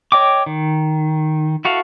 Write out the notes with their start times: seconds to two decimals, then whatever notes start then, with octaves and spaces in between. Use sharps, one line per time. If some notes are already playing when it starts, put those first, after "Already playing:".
0.12 C#5 D#5 G5 D6
0.46 D#3
1.65 E4 F#4 A4 F5